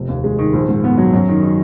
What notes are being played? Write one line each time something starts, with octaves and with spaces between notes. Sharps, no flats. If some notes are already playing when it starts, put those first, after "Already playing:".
Already playing: F1
D#2
G#3
D#3
A#1
G#2
B3
F#3
F#2
D#3
D#4